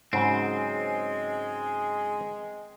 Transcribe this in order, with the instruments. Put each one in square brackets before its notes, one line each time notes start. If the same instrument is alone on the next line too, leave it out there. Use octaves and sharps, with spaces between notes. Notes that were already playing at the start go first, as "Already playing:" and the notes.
[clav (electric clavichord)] G#2 C#3 F#3 [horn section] G#3 [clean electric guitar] C4